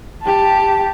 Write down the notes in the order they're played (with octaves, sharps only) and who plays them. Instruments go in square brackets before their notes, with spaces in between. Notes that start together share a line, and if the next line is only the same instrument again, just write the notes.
[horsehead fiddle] G4 A5